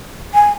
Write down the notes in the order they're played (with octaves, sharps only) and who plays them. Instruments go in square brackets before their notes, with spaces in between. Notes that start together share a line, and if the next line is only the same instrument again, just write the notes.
[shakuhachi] G#5